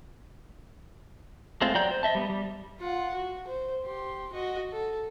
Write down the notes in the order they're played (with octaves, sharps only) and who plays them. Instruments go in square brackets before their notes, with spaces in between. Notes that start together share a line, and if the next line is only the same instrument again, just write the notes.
[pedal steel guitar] G#3 A3 C4 F4
F#3 D5 G5 A#5 G6
C5
D#5 E5 A5
G3 B3
G3
[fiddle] F4 F#5
F#4
C5
G4 C6
F#4 D#5
A4